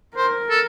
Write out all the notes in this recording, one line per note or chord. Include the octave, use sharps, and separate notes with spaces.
A#4 C5
A4